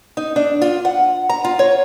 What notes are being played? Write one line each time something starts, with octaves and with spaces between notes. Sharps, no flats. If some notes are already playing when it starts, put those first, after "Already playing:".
D#4
D4
F4
F#5
A#5
F4
C#5